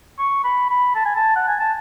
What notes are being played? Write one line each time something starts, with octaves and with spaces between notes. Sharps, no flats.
C#6
B5
B5
A5
G#5
A5
F#5
G#5
A5